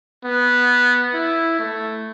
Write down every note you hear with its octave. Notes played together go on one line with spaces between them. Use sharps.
B3
E4
A3